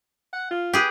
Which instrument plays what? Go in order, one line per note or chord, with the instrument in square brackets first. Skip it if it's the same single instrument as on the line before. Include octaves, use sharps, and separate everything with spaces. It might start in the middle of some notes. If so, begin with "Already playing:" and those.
[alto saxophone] F#5
F4
[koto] G4 G#4 B4